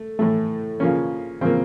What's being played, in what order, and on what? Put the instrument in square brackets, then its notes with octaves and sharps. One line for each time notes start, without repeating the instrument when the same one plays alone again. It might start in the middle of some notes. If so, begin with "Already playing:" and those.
Already playing: [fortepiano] A3
A2 E3 A3
C#3 F3 A#3 C#4
C#3 F3 A#3 C4